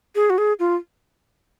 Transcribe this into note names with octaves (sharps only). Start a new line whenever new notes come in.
G#4
F#4
G#4
F4